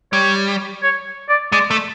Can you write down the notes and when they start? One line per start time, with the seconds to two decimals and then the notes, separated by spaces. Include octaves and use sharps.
0.12 G3 C#5
0.83 C#5
1.29 D5
1.52 G#3 D5
1.70 A3